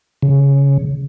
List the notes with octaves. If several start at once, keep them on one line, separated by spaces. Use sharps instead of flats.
C#3